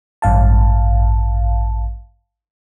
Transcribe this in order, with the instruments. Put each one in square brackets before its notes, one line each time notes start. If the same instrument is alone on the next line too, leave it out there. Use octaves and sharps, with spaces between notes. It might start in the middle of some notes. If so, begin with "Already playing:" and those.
[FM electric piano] A1 G2 F5 A5